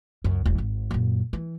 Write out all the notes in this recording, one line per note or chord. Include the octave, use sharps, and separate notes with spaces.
C#2 F#2
E1 E2
G#1
F#2 A#2
E3